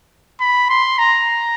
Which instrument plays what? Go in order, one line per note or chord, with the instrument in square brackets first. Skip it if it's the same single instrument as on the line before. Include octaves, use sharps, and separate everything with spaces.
[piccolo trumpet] B5
C6
A#5